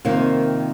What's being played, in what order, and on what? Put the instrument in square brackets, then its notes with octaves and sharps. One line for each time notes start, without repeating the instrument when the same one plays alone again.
[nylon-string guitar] F2 C3 D#3 A#3 D#4